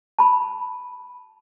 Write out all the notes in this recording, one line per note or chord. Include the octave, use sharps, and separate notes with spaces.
A5 B5